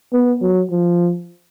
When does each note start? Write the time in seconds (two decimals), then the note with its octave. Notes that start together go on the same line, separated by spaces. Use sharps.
0.13 B3
0.41 F#3
0.70 F3